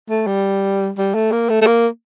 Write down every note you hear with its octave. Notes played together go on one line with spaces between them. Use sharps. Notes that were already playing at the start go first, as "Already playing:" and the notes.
A3
G3
G3
A3
A#3
A3
A3
A#3